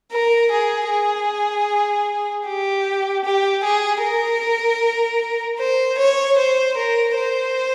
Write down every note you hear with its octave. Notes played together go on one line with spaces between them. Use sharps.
A#4
G#4
G#4
G4
G4
G#4
A#4
C5
C#5
C5
A#4
C5